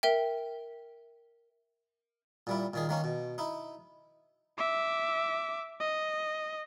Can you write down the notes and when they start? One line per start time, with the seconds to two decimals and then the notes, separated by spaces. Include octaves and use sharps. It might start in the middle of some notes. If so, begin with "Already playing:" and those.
0.03 A#4 E5 G5
2.47 A#2 G3 E4
2.74 A#2 D#3 G#4
2.89 D#3 A#3 C#4
3.04 B2
3.38 D#4 E4
4.58 E5 D6
5.80 D#5